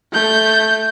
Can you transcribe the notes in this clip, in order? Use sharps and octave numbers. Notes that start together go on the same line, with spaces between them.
A3 G6